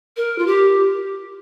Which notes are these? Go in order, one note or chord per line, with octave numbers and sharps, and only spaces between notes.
A#4
F4
G4